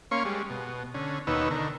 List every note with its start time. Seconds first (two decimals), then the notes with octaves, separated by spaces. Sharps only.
0.11 A#3 C#4 C#5 F5 C6 C#6
0.25 G3 G#3
0.50 B2
0.94 D3 C#4
1.27 D#2 B2 D#4 B4 C#5 E6
1.51 D3 D#3 A#4